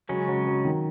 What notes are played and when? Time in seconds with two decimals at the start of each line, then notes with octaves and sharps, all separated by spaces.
0.09 C#3 F#3 G#3 C#4
0.28 F#3
0.47 F#3
0.65 D#3